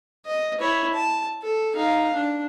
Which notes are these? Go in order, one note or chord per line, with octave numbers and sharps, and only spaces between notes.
D#5
E4 C#5
A5
A4
D#4 F5
D4